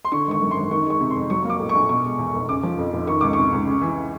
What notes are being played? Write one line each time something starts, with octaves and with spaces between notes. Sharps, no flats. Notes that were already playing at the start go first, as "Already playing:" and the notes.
C6
D3 C#6
G#1 C#6
F#2
C6
G#1
D#3 C#6
G#3 C#6
C3
F2 C6
F#3 C#6
A#3 C#6
D6
A2
C#6
A#1
B2 C#6
G#3
E2
F1
C#3 D6
F3
F2
F1
D#3 C#6
C#2 D6
C3 C#6
C#2
C#3
E3